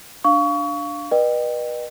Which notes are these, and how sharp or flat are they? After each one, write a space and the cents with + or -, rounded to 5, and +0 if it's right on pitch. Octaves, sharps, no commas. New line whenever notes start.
D4 +0 F5 +0 C#6 +25
B4 -30 D#5 -40 G5 +0